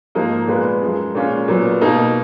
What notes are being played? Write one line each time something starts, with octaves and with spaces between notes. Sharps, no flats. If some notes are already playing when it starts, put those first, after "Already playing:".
G#2 F3 A#3 D#4
A#2 G#3 B3 F4 B4
F#2 F3 G#3
A#2 G#3 C#4 F4
A#2 F#3 B3
B2 A#3 D#4